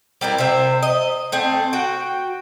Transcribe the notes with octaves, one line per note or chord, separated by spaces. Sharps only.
G3 C4 E4 A#4
C3 C5 E5
D#5
A3 C4 G#4
F#4 G5